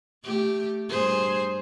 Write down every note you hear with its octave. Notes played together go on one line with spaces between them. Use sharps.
A3 G4
G2 G#4 C5